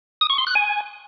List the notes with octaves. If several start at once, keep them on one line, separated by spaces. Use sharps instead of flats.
D#6
C#6
C6
F#6
G#5